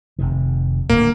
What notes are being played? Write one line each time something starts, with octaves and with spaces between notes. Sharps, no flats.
F1 C3 D#3
D#1 A2 D3 A#3